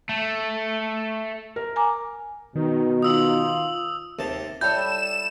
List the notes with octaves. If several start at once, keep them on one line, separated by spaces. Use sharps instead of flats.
A3
A#4
G#5 A#5 D6
B2 D#3
F4 D#6 E6 F#7
D#2 C3 A5
G3 E4 A4 C#5 G6 E7